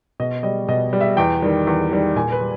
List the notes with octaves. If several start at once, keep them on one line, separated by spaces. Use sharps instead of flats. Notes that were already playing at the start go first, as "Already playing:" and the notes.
B2 D#5
G3 D#5
B2 D#5
G3
E5
E2 G5
D#3 G3
E2
D#3 G3
A#2 G#5
B4
G3